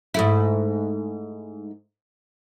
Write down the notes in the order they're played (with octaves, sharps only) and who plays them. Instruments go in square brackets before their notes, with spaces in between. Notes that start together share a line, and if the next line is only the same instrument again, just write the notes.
[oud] G#2 A3 E4